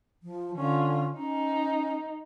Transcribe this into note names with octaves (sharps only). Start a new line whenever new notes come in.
F3
D3 C#4 F4
C#4 D#4